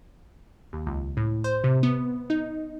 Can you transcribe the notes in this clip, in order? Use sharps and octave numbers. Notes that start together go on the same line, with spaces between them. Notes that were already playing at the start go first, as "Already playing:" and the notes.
D#2
C#2
A2
C5
C3
B3
D#4